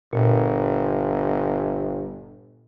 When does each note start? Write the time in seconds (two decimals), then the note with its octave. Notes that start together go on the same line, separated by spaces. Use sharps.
0.13 G1 A#2